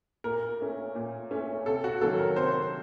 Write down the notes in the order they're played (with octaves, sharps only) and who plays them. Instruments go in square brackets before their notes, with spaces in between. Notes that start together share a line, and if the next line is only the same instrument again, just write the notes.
[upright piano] A#2 A#4
A3 C#4
A#2
A3 C#4
C3 A4
F#4
D#3 F#3 A#3 C#4 A4
A#4
C3 C5